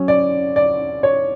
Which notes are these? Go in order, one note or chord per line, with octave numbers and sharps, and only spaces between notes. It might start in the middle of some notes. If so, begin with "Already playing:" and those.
Already playing: F#3 C#4
D5
D5
C#5